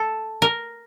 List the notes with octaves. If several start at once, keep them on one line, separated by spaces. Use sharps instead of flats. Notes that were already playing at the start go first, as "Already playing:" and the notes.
Already playing: A4
A#4